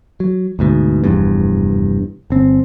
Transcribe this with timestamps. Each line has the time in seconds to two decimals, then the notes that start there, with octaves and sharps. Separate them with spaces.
0.20 F#3
0.59 D2 G#2 B2
1.04 F1 E2 G2
2.30 G1 C4